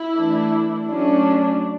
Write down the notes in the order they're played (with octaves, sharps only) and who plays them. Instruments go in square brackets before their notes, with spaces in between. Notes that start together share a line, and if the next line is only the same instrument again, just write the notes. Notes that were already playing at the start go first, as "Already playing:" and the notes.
Already playing: [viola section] E4
E3 A3 D4
F#3 A3 C#4 D4